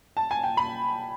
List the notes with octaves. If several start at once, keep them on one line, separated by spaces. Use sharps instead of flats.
A5
G#5
G5
B5